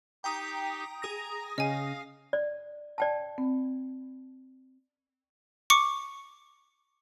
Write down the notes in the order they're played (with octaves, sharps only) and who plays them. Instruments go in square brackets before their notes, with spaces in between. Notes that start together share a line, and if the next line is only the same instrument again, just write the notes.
[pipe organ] D#4 G4 [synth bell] G5 A#5 D#6
[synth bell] G#4 D#6 A#6 [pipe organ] A#5
[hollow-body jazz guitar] C#3 C#4 [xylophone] D#5 G#5 [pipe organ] F5
[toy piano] D5
D5 G5 A5
[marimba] C4
[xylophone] C#6 D6 C#7